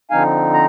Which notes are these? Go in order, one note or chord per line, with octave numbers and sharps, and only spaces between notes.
D3 F3 C4 D#4 F5 G#5
A#5